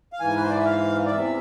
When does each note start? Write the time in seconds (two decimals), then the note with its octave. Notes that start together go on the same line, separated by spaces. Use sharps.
0.13 F5
0.20 G#2 E3 G#5
0.35 B4
0.43 C5
0.50 D5
0.59 E5
0.65 F5
1.06 D5
1.11 E2 C3 E3 E5